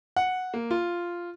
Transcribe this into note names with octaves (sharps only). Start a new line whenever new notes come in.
F#5
A#3
F4